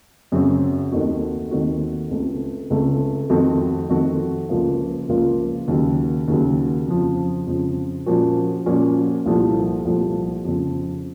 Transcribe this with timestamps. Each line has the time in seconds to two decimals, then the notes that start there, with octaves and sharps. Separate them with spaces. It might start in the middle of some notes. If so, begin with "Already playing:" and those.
0.32 F#2 C#3 F#3 C4 F#4
0.92 D#2 D#3 A3 C4 F#4
1.51 D#2 D#3 A3 C4 F#4
2.11 C#2 C#3 A3 C4
2.70 C#2 C#3 A3 C4
3.30 F2 D#3 A3 C4 F#4
3.89 F2 D#3 A3 C4 F#4
4.49 C#2 C#3 F3 A#3 F4
5.08 C#2 C#3 F3 A#3 F4
5.68 D#2 C#3 F#3
6.28 D#2 C#3 F#3
6.87 F2 C#3 F3
7.47 F2 C#3 F3
8.06 A#2 F3 A#3 C#4 F#4
8.66 A#2 F3 A#3 C#4 F#4
9.26 C2 A#2 F3 A3
9.85 C2 A#2 F3 A3
10.45 F2 C#3 F3 C4